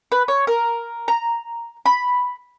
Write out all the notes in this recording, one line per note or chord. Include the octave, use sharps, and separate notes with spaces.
B4
C#5
A#4
A#5
B5